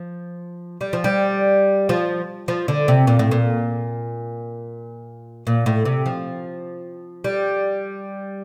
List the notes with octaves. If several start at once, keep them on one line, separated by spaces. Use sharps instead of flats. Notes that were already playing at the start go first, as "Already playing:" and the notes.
Already playing: F3
G3
F3
G3
F3
F3
D3
C3
A#2
A2
A#2
A#2
A2
C3
F3
G3